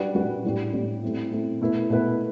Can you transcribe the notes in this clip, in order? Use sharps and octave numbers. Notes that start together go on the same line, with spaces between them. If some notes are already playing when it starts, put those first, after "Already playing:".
Already playing: G3 D4 F#4 B4
G3 D4 F#4 B4
A2 G3 D4 G4
A2 G3 D4 G4
A3 C4 E4
A3 C4 E4
B2 A3 E4 B4
B2 A3 E4 B4